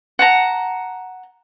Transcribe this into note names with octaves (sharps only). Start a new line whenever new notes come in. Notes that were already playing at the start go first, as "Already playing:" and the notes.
F#5 A5 A#5